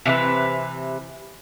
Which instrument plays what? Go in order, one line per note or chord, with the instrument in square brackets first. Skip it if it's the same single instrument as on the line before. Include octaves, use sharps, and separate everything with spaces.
[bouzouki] C3 E3 B4